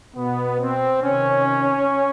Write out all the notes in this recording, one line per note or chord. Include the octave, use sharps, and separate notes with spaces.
B2 B3
C4
C3 D#3 C#4